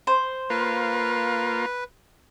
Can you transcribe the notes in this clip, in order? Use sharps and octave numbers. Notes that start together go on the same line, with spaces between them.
C5
A#3 F4 B4